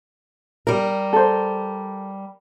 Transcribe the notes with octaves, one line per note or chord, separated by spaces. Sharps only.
G3 A#4
A4 C5